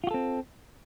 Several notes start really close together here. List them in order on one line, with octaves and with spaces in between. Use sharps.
F4 F#4 A4 C4